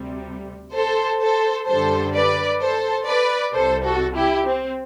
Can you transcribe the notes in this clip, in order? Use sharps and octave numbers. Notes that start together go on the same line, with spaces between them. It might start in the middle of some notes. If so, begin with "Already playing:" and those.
Already playing: D2 C3 G3
A4 C5
A4 C5
F#2 D3 G3 A4 C5
B4 D5
A4 C5
B4 D5
C2 C3 G3 A4 C5
F#4 A4
E4 G4
C4